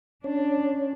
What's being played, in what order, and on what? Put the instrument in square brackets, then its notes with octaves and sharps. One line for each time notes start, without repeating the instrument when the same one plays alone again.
[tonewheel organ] C#4 C#5 [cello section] D4